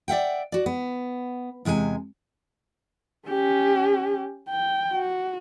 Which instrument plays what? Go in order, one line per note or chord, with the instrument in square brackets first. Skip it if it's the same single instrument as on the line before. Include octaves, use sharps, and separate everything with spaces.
[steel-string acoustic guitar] D5 E5 F#5 G5
F#4 D5
B3
E2 C3 G#3 A#4 G#5
[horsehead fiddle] C#4 G4
G5
F#4